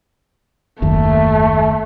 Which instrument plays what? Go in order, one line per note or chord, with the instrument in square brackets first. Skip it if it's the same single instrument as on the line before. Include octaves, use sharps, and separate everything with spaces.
[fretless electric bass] F#1 D#2 [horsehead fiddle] A3